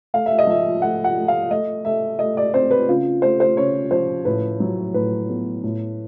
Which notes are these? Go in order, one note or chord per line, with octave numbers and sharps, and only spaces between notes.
A3 F5
E5
D#5
F3 E5
A3 F#5
F#5
A3
F5
A3 D#5
A3 E5
A3 D#5
D5
C4 C5
B4
C#3 F4
A3 C5
C5
C#3 C#5
F3 C5
A2 B4
F#3
A2 B4
B3
A2